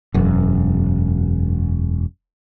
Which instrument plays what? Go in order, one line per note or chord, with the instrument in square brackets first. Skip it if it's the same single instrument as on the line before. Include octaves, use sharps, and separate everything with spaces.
[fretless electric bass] E1 F#2